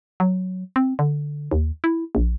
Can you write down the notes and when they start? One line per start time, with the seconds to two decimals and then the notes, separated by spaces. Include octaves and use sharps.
0.20 F#3
0.76 C4
0.99 D3
1.51 D#2
1.84 E4
2.15 A#1